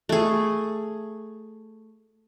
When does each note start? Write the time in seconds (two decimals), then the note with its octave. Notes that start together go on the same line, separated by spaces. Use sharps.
0.09 A3 G#4